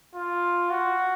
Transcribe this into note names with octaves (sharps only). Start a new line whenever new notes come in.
F4
F#4